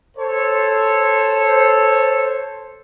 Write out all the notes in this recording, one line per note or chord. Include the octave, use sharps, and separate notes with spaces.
A4 C5 C#5